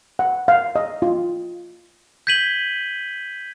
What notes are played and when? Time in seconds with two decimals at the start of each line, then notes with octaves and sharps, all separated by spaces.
0.19 F#5
0.48 F5
0.76 D#5
1.02 F4
2.27 G6 G#6 B6 D#7 F#7 G7